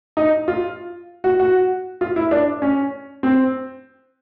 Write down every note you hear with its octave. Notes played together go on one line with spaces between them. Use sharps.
D#4
F4
F#4
F#4
F4
E4
D4
C#4
C4